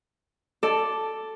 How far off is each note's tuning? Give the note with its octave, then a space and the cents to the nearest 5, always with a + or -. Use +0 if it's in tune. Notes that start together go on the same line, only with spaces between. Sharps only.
A4 +0 D5 +0